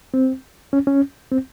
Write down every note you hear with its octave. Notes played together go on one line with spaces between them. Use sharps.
C4
C#4
C#4
C4